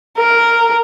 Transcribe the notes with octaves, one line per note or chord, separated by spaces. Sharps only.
A#4